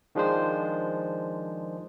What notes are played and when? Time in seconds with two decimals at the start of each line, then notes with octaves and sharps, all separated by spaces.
0.15 D#3 F3 G#3 D4 G#4 C5